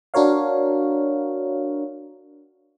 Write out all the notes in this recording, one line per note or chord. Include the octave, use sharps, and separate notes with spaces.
D4 F#4 A#4 C#5 F5